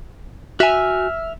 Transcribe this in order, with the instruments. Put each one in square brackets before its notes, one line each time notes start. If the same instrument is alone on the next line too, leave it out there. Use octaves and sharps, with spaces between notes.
[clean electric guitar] F#4 G#5 [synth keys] E5 F6